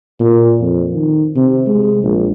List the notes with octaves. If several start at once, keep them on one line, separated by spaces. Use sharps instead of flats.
A#2
F2
D#3
C3
G#3
A#1